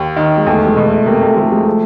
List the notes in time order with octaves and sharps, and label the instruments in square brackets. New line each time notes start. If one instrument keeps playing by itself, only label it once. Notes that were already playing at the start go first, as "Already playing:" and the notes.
Already playing: [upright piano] D#2 [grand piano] A#3
[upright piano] D#3
[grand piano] G#3
[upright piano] E2 [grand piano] A3
[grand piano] G#3
[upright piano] B2
[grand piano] A3
[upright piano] C3 [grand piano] A#3
[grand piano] A3
[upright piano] F3 [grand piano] A3
[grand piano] G#3
A3